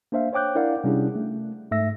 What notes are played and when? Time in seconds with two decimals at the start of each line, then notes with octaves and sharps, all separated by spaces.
0.12 A#3 D4 C5 E5 F5
0.33 C5 C#5 G5 D6 F#6 G6
0.55 D4 E4 A#4 D5 F5 F#5
0.84 C3 G3 C#4 D4 E4 G#4
1.16 A3
1.71 G#2 A3 E5 E6 A#6